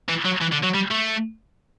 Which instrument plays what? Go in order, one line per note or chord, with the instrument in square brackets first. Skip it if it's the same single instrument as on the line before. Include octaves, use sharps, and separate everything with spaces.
[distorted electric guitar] E3
F#3
E3
D3
F#3
G3
A3